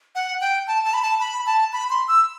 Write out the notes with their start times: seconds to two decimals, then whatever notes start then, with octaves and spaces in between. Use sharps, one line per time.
0.15 F#5
0.41 G5
0.67 A5
0.85 A5
0.94 B5
1.03 A5
1.20 B5
1.46 A5
1.73 B5
1.90 C6
2.08 E6